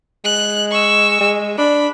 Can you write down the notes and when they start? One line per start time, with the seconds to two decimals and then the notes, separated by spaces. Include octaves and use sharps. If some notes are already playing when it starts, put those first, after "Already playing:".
0.25 G#3 F#6
0.71 C#6 E6
1.21 G#3
1.58 D4 B5